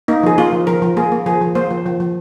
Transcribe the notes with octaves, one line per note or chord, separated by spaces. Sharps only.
A#3 D#4
F3 G#4
A#3 F4
F3
F3 A#4
F3
A#3 G#4
A#3
F3 G#4
F3
A#3 C5
F3
F3
F3